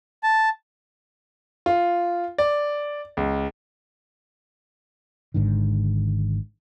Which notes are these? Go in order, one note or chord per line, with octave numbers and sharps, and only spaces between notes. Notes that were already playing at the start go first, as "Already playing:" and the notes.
A5
F4
D5
C#2
G#1 G#2 D3 D#3